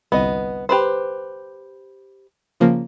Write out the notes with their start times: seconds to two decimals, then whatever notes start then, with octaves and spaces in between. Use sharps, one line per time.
0.12 G1 C2 B3 D#5
0.69 G4 B4 C5
2.60 C#3 F3 A#3